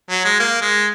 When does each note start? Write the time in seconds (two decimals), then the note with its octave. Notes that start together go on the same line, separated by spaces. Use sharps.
0.10 F#3
0.25 G#3
0.40 A#3
0.62 G#3